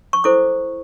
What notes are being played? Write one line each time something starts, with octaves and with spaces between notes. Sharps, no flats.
C#6
E4 A4 C5 D6